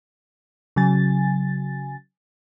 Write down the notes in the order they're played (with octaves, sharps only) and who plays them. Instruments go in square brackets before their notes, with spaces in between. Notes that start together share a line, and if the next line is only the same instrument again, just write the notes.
[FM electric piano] C#3 F#3 G#5 A6